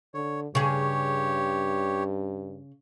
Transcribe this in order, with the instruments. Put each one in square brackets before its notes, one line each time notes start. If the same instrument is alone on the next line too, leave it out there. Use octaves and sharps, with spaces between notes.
[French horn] D3 [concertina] C#5
[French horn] G2 [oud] C#3 G#4 [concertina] G4 C#5